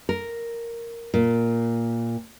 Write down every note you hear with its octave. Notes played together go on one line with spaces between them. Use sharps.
A#4
A#2